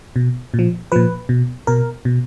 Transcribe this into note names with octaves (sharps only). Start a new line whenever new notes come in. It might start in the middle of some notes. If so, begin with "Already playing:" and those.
B2
A#2
F3
A#2 F3 B4
B2
B2 A#4
B2